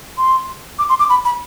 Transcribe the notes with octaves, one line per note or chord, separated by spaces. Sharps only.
C6
D6
C6
D6
B5
B5